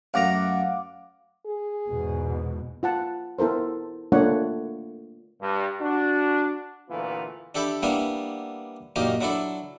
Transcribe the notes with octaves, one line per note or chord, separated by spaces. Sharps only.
F#2 A3 F5 F#5 A#5 D6
G#4
E2 G#2 B2
F4 F#5 A5
B3 E4 A4 A#4 C5
A3 A#3 D4 F4 C#5 F#5
G2
D4 F#4
D2 A#2 E3 A3 B3 F4
D4 G4 A4 E5 G5 B5
G3 A#3 B3 D4 E4
F#2 A#2 A#3 D#4 G4 A#4
F#3 D4 E4 A4 D5